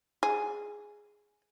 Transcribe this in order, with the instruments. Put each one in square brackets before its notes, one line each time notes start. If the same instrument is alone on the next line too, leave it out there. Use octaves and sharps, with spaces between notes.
[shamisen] G#4